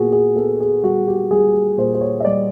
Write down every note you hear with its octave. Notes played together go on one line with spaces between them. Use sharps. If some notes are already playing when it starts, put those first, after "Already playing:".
Already playing: A#2 B3 F#4 G#4
G#4
B3 A4
G#4
G3 F#4
G4
G3 G#4
A#2 C5
C5
C#5
D#5
G3 D5